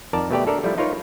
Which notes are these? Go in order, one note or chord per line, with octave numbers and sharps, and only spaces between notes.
F2 D#3 A#4 D5 A5
B2 A3 G4 D5
D4 A4 A#4 D5
F3 G3 A3 E4
D#4 F4 A#4 B4 C#5